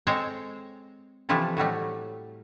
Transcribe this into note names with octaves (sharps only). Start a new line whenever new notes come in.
G#3 C4 A4 C5 C#5 G5
C3 E3 F3 A3 E4 A4
A2 F#3 G3 A3